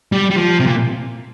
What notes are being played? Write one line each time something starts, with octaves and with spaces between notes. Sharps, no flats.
G3
G3
F3
C3
A#2